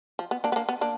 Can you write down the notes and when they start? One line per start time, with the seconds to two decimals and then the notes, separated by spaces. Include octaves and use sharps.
0.19 F3
0.31 B3
0.44 A#3 D4
0.52 B3
0.56 A#3 D4
0.69 B3
0.81 A#3 D4